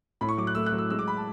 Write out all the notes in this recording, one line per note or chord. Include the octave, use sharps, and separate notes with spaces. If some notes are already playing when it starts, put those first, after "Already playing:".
A2 B5
C#6
F#3 D6
F#6
A3 E6
F#6
F#3
E6
G#3 E6
D6
B5
A5